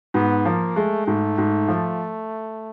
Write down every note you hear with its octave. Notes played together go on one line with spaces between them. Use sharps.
G#2 B3
F3 A#3
G#3 A3
G#2 A3
G#2
F3